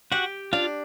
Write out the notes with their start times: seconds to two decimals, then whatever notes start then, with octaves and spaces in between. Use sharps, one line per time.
0.12 F#4 G4 F#5
0.53 D4 F4 F5